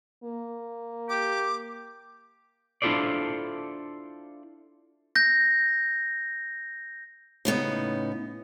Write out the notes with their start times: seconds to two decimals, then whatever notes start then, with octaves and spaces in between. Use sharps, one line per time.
0.24 A#3
1.10 G4 D6
2.82 D4 E4 F4 A4 C5 D5
5.15 G6 A#6
7.45 A2 C#3 B3 D#4